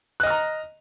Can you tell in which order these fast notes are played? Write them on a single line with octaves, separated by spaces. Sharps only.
F#6 D#5 F6 A#5